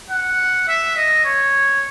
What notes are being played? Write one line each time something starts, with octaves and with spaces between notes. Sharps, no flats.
F#5
E5
D#5
C#5